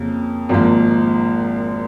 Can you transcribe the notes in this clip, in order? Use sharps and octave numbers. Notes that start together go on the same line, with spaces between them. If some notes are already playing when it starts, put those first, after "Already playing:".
Already playing: F2 C#3 A#3
G#1 G#2 F3 A#3